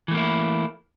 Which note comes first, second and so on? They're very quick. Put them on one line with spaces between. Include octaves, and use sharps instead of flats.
E3 A3 A#3 E4